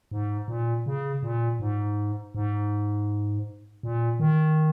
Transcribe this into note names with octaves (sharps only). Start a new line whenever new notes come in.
G#2
A#2
C#3
A#2
G#2
G#2
A#2
D#3